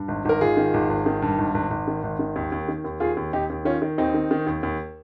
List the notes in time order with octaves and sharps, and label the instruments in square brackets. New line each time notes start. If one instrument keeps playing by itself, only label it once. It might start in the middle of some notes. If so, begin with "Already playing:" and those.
Already playing: [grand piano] G2
G#1
G#1 A#4
G#1 F4 G#4
D#3
G#1
G#1
D#3
G2
G#1
G#1
G#1
D#3
G#1
D#3
D#2
D#2
D#3
D#2
D#2 F4 G#4
D#2
D#2 D#4 G4
D#2
D#3 C#4 F4
D#3
D#2 C4 D#4
D#3
D#3
D#2
D#2